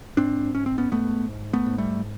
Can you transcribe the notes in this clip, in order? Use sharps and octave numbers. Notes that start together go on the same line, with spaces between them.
G#2 C4 D4
G#2 C#4
C4
B3 C#4
G#2 A3 B3
G#2
A3 B3
G#2
G3 A3